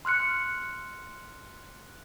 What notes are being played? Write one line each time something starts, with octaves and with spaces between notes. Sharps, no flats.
C6 F6 F#6 C#7